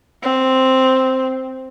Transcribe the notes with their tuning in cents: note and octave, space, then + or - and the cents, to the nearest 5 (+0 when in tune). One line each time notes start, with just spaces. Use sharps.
C4 +0